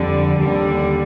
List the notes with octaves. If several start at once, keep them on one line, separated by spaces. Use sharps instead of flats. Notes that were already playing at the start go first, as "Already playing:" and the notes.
Already playing: F2 D3 G3
D#2 D3 G3